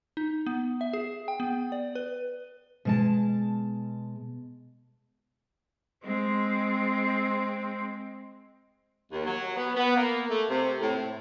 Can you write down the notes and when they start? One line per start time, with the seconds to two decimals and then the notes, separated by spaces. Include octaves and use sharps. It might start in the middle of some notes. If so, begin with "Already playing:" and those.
0.17 D#4
0.46 B3
0.81 E5
0.93 G#4
1.28 G5
1.40 B3
1.72 D5
1.95 B4
2.85 B2 G#3 A5
6.04 G#3 C4
9.12 D#2
9.26 F#3
9.56 B3
9.76 B3
9.96 A#3
10.29 A3
10.49 C3
10.80 A2
10.97 A2